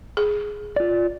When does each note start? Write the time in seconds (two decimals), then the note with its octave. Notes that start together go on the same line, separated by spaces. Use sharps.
0.17 G#4
0.76 F4 D5